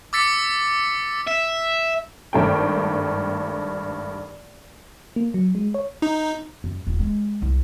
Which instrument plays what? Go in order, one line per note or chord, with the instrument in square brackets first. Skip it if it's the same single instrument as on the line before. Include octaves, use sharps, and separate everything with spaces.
[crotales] D6 E6 A6 B6 C#7
[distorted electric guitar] E5
[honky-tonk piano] G#1 G2 A3 G5
[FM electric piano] A#3
F#3
G#3
C#5
[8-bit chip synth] D#4
[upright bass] F#2
D#1
G#3
C2